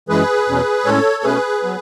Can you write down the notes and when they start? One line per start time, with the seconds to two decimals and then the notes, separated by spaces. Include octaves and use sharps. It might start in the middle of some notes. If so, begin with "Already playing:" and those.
0.09 F#2 E3 G#3 G#4 B4
0.48 E2 B2 F#3 C#4
0.85 A2 G#3 C#4 A4 C#5
1.24 B2 A3 C#4 G#4 B4
1.63 F#3 B3